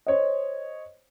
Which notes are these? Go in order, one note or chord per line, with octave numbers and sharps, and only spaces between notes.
C5 C#5 D#5